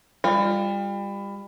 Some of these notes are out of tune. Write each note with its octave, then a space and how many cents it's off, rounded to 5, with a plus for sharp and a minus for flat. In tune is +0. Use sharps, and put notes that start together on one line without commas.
G3 +30 F4 +0